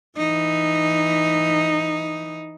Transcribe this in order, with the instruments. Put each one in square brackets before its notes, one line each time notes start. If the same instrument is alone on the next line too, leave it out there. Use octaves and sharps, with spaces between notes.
[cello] E3 D#4